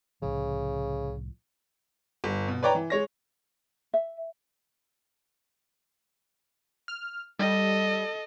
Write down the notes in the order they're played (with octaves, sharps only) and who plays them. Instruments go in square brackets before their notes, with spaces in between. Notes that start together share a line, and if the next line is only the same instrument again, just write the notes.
[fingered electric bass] C2 A2 F3 [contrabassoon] C#3
[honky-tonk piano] G1
B2
B4 C#5 D5 G5 A#5
E3
G#3 C#5 A#6
[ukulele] E5
[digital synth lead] F6
[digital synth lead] G3 [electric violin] A4 D#5